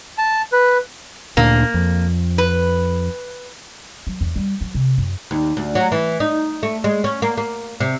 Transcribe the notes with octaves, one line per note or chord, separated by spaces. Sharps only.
A5
B4
D2 A#2 D3 A#3
F2
B4
F#3
E2
G3
F#3
C3
F#2
D#2
D2
F#3
E3
D#4
A3
G#3
C#4
A#3
A#3
C3